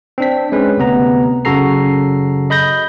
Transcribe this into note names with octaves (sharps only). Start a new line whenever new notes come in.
C4 D4 B6
G#3 C#4 B4
D2 C3 B3 A#5
F#2 C#3 F#4 A4 A#5 C7
D#5 B5 G6 A#6